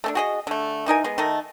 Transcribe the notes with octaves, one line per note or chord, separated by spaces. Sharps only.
A3 C#4 D4
F#4 G#4 D#5
D3 A3
E3 D#4 A#4 G#5
G#3 B3
D#3 A3 A4 D#5